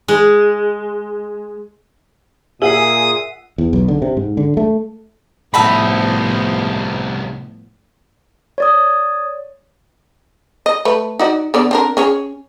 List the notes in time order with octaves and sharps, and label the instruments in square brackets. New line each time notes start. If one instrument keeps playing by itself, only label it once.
[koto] G#3
[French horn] A#2 [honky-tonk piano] G#4 E6 F#7 [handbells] E5 F#5 C7 [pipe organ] D#6
[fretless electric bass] E2
B1
D3
C3
G#2
D3
A3
[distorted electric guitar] C2 D#4 [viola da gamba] A2 F3 B3 [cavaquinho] E5 A5 B5
[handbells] C#5 D5 D#6
[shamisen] D#5
A3 B4
D#4 F#4 D5
D3 B3 D5
C4 D4 A#4
C#4 G#4 C#5